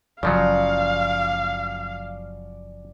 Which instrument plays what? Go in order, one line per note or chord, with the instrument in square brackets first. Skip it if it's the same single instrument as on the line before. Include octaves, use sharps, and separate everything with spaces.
[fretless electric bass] F#1 F#2 [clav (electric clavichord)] C#3 F3 F#3 [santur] D5 F#5 [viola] F5